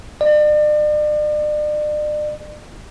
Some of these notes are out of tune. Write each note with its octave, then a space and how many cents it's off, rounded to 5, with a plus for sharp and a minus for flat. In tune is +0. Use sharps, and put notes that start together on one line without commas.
D5 +40